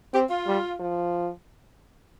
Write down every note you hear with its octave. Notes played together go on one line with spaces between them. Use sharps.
C4 G4
F4
G3
F3